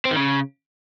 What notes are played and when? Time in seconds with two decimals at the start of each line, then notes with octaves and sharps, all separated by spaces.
0.05 C4
0.11 D#3
0.16 C#3